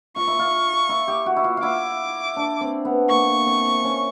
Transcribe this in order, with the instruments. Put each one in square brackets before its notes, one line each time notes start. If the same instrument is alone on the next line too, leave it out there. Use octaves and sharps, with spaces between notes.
[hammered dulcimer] F4 [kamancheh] C#6
[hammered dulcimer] E4
F4
E4
G4
F#4
E4
F4
F4
[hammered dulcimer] E4 [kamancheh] D6
[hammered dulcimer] D4
C4
B3
[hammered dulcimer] A#3 [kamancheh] C#6
[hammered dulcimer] C4
C#4